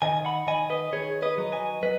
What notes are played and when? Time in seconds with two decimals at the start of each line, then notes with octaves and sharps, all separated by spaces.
0.02 D#3 D#5 G#5
0.25 F#5 B5
0.47 D#3 D#5 G#5
0.70 B4 D#5
0.92 D#3 G#4 C#5
1.22 B4 D#5
1.38 F#3
1.52 D#5 G#5
1.83 F#3 B4 D#5